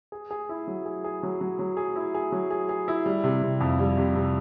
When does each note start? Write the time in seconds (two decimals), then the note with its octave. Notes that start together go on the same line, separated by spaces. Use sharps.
0.12 G#4
0.31 G#4
0.49 E4
0.67 F#3
0.86 G#4
1.04 G#4
1.23 F#3
1.41 F#3
1.59 F#3
1.77 G#4
1.96 E4
2.14 G#4
2.32 F#3
2.51 G#4
2.69 G#4
2.88 E4
3.06 G3
3.24 C3
3.43 C3
3.61 F2
3.79 G3
3.97 C3
4.16 C3